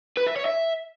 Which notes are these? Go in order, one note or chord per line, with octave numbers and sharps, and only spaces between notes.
B4
E5
C#5
E5